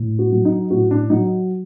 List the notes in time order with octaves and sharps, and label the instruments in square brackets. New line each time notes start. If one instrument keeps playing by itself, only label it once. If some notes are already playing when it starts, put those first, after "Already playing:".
Already playing: [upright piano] A2
F#4
F#3
D#4
A2 F#4
D4
F#3 D#4